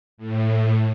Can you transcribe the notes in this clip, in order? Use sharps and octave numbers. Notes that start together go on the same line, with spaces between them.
A2